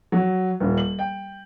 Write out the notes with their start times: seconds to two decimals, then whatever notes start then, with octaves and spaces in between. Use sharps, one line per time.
0.12 F#3
0.60 D#1
0.77 F#7
0.99 G5